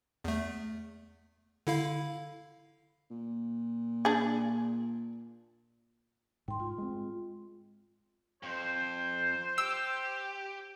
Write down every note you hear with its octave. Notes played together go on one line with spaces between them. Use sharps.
E2 A3
D3 E4 F5
A#2
D4 G#4
G#2 G5 C6
F4
G#3 C4
F2 C5
G4 E6